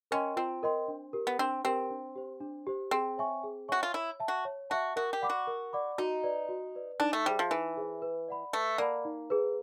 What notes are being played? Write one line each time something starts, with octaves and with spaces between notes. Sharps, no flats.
C#4 A#4 D#5 G5 C6
C4 F4
A#4 D#5 G5 C6
D4
G4 A#4
B3
C4 D4
C4 G4 A#4
D4
G4 C5
D4
G4 C5
C4 G#4
C#5 E5 G#5 C#6
G#4
F#4 C#5 E5 G#5 C#6
F4
E4 C#5
E5 A5
F#4
C#5
F#4 E5 A5
F#4 A#4
G4
D5 F#5 B5 D6
F#4
A#4
D5 F#5 B5 D6
D#4 F#4
B4 D5
F#4
B4 D5
D4 D#4
A3
G3 G#4 C5 E5
F3
E3 D#4
G#4 C5 E5
B4
D5 F#5 B5
A3 B4
A#3 D5 F#5 B5
D#4
G#4 B4